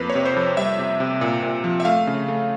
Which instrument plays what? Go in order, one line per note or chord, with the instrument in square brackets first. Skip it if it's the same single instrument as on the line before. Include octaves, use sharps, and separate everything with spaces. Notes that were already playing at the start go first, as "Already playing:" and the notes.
Already playing: [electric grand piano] F2 A#3 B4
C#5
C3
C5
F2
G3 E5
C3
C3
A#2
A#2
F3
E5
A3 F5
C#3
A3